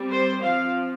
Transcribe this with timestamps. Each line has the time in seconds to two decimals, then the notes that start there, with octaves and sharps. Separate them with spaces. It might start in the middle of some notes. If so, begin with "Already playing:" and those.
Already playing: G3 C4
0.11 C5
0.44 F3 C4 F5